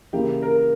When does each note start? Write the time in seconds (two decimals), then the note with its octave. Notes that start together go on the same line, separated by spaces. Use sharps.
0.13 C#3 E3 A#3 E4 G4
0.42 A#4